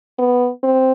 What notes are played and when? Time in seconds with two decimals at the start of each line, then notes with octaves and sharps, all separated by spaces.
0.19 B3
0.63 C4